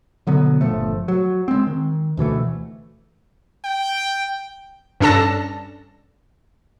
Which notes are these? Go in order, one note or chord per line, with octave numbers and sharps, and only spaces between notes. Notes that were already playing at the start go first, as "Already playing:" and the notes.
B2 D3 F#3 B3
G1 A#2 F3 A3
F#3
G#3 C4
D#3
D2 B2 E3 A3
G5
G2 C#4 D4 A4 A5 A#6